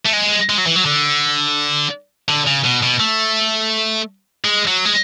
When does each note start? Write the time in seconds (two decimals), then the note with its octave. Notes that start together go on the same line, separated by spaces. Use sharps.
0.06 A3
0.13 G#3
0.50 G#3
0.58 F#3
0.66 E3
0.76 F#3
0.85 D3
2.29 D3
2.47 C#3
2.65 B2
2.83 B2
3.00 A3
4.45 G#3
4.67 F#3
4.86 G#3